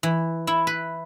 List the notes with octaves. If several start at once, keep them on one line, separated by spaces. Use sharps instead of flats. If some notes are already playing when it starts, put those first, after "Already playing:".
E3
E4
B4